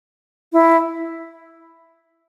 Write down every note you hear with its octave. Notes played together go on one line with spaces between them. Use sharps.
E4